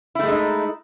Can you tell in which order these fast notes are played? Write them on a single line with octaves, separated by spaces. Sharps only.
E4 A3 G#3 D#4